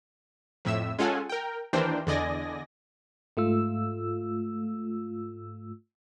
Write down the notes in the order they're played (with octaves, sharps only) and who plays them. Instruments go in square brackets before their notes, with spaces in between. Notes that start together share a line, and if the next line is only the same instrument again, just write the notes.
[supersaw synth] F2 A2 E5 E6
G#3 C#4 F4 A4 F#5 G#5
A#4 G5
D#2 E3 D4 A#4 C5 G5
E2 D3 D5 D#5 G#5 A#6
[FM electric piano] G#2 A3 F4 E6